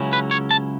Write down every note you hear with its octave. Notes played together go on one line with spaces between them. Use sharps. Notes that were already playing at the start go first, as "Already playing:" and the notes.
Already playing: C#2 C#3 F#3 C#4 E4
B4
C#5
A5